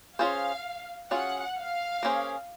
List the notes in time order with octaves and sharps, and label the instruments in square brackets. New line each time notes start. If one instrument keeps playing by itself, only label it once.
[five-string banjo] C#4 F4 G#4 C5 [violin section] F5
[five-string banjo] F#3 C#4 F4 G#4 [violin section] F#5
[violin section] F5
[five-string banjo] A#3 C#4 G#4 C5